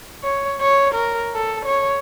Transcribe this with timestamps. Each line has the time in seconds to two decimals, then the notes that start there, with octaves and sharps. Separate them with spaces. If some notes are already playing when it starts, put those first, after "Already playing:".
0.23 C#5
0.61 C#5
0.94 A#4
1.35 A4
1.66 C#5